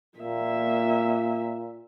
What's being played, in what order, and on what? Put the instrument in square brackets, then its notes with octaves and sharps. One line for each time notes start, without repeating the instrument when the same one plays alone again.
[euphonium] A#2 [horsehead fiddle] A#3 E5